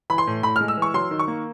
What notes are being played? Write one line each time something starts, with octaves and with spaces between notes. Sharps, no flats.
E3 B5
C6
A2
A2 B5
G#3 F6
E6
E3 C#6
F#3 C6
D#3
C#6
A#3